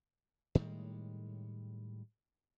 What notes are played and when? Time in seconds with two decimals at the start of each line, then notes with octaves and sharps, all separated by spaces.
0.55 A2 D#3 G3 G#3